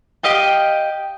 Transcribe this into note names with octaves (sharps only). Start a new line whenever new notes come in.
G4 D#5 F5 G5